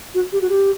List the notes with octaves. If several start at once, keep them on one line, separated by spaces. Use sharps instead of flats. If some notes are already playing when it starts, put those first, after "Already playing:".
F#4
G4
F#4
G4